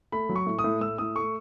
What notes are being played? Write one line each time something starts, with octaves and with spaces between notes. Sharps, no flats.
A3 B5
F#3
C#6
A2
D#6
A2
A2 E6
A2 D#6
A3 C#6